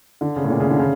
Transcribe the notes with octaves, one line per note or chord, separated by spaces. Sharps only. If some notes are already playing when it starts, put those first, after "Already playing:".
D3
C#3
A2
A#2
C#3
D3
C#3